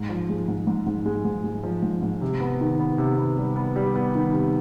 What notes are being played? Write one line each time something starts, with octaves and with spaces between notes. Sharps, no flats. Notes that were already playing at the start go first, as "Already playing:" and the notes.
Already playing: G#2
F3
G#3
G#2
G#2
G#2
G#3
G#2
G#3
F3
G#2
G#2
C3
B3
D#3
B3
C3
B3
G3
B3
G3
B3
D#3
C3